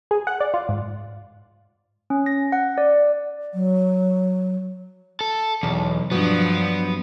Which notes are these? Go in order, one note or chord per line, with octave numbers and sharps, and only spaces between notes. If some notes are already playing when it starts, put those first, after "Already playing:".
G#4
F#5
D5
F4
G#2
C#4
A#6
F#5
D5
F#3
A4
B1 E2
G2 F3 F#3 B3 D4